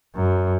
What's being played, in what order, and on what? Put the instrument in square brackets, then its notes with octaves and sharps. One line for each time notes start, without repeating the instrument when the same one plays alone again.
[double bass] F#2